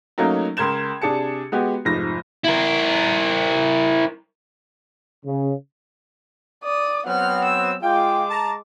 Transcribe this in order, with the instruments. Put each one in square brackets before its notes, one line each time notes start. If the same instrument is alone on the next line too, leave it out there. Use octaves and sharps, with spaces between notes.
[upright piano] F#3 A3 A#3 C#4 D#4
C#2 A#4 C6 G#6 E7
C3 D4 G#4 A5 C#7
G#3 B3 F#4 G4
F1 G#2 F3 A#6
[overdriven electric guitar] E4 A#4
[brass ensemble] C#3
[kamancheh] D5 D#6
[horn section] F#3 B3 C4 [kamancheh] F#5 F6
[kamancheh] E6
[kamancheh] G#3 D6 [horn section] F4 G5
[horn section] A5 A#5